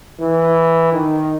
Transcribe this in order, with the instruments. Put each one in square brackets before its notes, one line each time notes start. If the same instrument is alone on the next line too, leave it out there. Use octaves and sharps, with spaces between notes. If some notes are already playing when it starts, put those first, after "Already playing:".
[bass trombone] E3
D#3